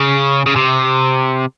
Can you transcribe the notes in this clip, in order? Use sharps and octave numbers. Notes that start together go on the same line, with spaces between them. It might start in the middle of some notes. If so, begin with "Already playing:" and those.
Already playing: C#3
C#3
C3